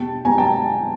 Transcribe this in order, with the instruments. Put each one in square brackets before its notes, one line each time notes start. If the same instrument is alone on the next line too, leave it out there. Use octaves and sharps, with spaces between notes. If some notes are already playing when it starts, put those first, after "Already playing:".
Already playing: [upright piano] E2 B2 G3 G5 A5
E2 B2 G3 G#5 A#5
G5 A5